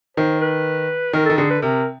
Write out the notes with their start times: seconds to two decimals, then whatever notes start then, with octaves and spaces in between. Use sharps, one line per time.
0.17 D#3 C5
0.41 B4
1.13 D#3 A#4
1.25 D#3 A4
1.38 D3 G#4
1.50 B4
1.62 C3 A#4